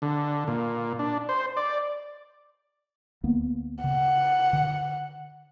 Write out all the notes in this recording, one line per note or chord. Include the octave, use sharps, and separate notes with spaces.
D3
A#2
D4
C5
D5
D2 A#3 B3
C#3 F#5
D3